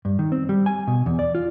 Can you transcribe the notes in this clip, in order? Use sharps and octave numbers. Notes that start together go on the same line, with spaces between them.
G2
D#3
C4
G3
G#5
B2
E2
D5
F4